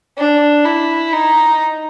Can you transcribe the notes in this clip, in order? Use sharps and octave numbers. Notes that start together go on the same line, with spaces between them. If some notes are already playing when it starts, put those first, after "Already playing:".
D4
E4
D#4